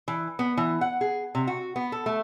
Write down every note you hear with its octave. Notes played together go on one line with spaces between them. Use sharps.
E3
B3
E3
F#5
G#4
C3
F#4
B3
A4
A3